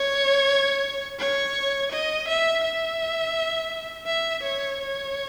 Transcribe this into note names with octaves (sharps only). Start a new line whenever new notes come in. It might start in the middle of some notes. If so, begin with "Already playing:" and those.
Already playing: C#5
C#5
D#5
E5
E5
E5
C#5
C#5